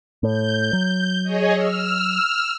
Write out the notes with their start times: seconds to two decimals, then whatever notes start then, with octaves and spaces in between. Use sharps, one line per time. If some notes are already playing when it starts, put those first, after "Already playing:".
0.23 A2 G6
0.73 F#3
1.23 G#4 C#5 D#5
1.54 E6 F6